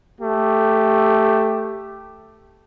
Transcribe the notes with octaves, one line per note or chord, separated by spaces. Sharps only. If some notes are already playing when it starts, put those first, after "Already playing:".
A3 G4